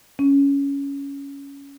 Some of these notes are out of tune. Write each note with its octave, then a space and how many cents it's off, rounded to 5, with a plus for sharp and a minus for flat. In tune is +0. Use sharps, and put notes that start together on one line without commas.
C#4 +10